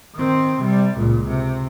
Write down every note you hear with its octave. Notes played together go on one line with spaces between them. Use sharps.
D#3 C4
C3 G3
C#2 A#2
C3